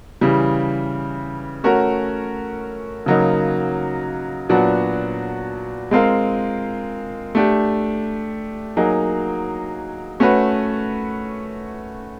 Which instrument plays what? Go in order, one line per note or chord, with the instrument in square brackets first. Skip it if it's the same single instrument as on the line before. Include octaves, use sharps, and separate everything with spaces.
[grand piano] C#3 E3 G3
A3 C#4 F#4 A#4
C#3 F#3 A#3 D#4
A#2 F#3 B3 D4 F#4
G#3 C4 F4 A#4
A3 D4 G4
F#3 A#3 D#4 G#4
A3 C#4 F#4 B4